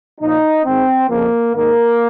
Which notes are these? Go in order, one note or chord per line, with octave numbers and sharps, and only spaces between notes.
A#2 F3 D#4
G#2 D#3 C4
F2 C#3 F3 A#3
G#2 D#3 A#3